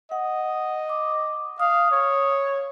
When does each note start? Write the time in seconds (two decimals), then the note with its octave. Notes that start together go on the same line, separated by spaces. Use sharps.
0.12 D#5 F#5
0.89 D6
1.60 F5 D#6
1.91 C#5